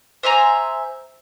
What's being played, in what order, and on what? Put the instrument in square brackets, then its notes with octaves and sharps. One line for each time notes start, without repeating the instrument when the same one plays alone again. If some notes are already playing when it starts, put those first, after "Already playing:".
[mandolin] C5 E5 G#5 A#5